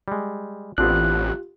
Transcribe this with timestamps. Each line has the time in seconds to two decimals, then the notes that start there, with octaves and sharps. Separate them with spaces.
0.08 G3 G#3
0.78 A1 B3 C4 D4 F4 G4 F#6